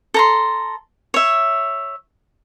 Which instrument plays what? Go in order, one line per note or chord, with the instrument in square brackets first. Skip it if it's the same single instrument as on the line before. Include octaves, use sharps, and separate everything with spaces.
[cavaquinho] A4 A#5 C6
C#5 E5